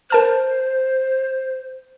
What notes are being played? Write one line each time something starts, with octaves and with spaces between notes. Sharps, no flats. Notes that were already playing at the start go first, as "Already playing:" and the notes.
A#4 C5 A5 F6